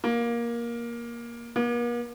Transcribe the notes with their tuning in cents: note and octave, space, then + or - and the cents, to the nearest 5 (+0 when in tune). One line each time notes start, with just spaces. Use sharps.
A#3 +15
A#3 +45